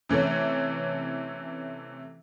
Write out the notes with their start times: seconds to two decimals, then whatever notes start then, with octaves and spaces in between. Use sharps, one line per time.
0.09 C3 E3 A3 C#4